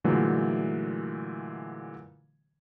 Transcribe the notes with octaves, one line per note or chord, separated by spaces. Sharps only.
A#2 D3 E3 F#3 G#3 A3